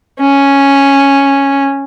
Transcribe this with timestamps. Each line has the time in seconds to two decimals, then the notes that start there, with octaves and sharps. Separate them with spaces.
0.20 C#4